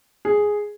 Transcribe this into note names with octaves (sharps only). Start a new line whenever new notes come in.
G#4